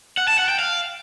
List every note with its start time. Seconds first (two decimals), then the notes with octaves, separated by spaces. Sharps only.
0.17 F#5
0.28 A5
0.38 F#5
0.49 G5
0.59 F5